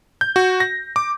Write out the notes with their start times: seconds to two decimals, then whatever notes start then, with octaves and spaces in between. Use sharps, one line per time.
0.21 G6
0.36 F#4
0.60 A#6
0.96 D6